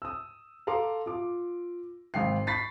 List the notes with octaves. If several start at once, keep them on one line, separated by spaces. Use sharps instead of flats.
D#6 E6
A4 F5 A#5 C6 D6
F4 D6
G#1 F5 G5 C7
B5 C#6 A6 B6 C7